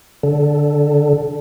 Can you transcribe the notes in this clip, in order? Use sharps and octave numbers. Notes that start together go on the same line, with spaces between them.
D3